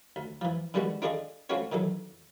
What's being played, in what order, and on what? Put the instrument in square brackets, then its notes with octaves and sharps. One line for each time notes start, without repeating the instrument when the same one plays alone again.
[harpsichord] D2
E3 F3
D3 D#3 G3 G#3 B3 F#4
D4 F4 G#4 A4 D5 D#5
A3 C4 C#4 F4 F#4 C#5
D#3 E3 F#3 A4